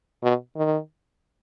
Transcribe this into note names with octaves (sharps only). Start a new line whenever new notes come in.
B2
D#3